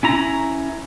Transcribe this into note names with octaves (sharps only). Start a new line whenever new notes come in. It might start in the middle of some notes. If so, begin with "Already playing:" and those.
C#4 E4 A#5